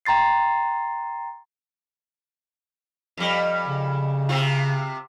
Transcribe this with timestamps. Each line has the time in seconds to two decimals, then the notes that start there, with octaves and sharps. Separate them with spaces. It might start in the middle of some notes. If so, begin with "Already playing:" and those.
0.06 G5 A#5 C6 A6 C7
3.17 F2 G3
3.68 C#3
4.29 C3 C4 F4